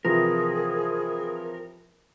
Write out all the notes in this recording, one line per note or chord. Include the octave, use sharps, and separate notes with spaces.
C3 E3 F3 G#4 A#4